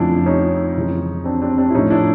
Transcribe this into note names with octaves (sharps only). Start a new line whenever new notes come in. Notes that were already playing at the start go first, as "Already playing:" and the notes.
Already playing: F2 C#3 F3 A3 D4 E4
C#4 D#4
F2 C#3 E3 G#3
C4 D4
C4 D4
C4 D4
E4
A2 F3 A3 C#4 D#4
D4 E4